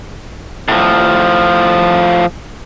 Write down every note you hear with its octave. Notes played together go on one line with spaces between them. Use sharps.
A2 F3